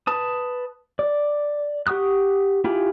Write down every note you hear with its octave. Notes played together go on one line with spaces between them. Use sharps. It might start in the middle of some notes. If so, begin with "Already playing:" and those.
B4 A5 D#6
D5
G4 F#5 C#6 D#6 F#6
E4 F4 G4 G#4